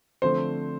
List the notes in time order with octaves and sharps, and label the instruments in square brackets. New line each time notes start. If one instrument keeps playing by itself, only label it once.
[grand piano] D3 F3 A3 C4 [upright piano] C5